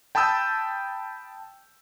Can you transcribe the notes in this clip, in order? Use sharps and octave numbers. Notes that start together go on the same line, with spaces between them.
G5 A5 B5 D#6 E6 G6